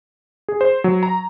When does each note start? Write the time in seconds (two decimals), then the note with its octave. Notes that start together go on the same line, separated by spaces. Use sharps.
0.48 G#4
0.61 C5
0.84 F#3
1.03 A#5